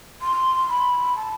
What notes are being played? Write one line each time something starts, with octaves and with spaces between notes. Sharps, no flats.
C6
B5
A5